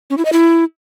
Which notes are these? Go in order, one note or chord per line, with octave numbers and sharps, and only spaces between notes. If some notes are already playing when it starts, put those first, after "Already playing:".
C#4
E4
D#5
E4